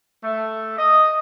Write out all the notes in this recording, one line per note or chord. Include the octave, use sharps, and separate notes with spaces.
A3
D#5